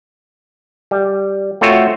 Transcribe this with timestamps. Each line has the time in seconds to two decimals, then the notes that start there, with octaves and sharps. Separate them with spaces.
0.91 G3
1.61 A3 C4 F4 F#4 C#5 E5